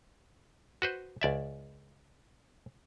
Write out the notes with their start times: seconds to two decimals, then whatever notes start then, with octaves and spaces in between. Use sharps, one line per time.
0.82 F#4 B4 C5
1.21 C#2 D5 E5